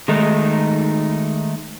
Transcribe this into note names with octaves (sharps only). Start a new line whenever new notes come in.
D#3 G#3 A3 D#4